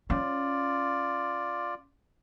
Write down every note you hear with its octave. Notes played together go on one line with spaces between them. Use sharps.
C#4 F4 D5